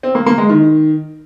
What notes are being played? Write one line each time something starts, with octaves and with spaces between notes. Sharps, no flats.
C4
A#3
A#3
G#3
D#3